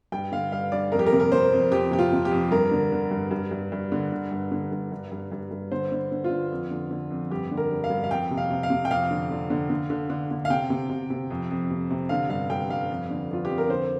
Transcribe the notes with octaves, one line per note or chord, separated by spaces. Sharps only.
G2 G5
D3 F5
G2 F5
G2 D5
F2 A#4
G4
A#4
C3
A#4
C3 C5
F2
F2 G4
C3 G4
F4
C3
G4
F2
G2 A#4
D3
D3
G2
G2
G2
G2
D3
D3
G2
D3
G2
G2
G2
G2
G2
D3 C5
D3
D3
F4
D3
F2
D3
D3
F2
G2 G4
D3
A#4
G2
F5
G2
F5
F2 G5
C3
F5
C3
F5
C3
G5
F2 F5
D3
D3
D3
D3
D3
D3
D3
F5
C3 G5
C3
C3
C3
F2
F2
C3
C3
D3 F5
G2 F5
G2 G5
G2 F5
F2
D3
F2 F4
F2 G4
A#4
D3 C5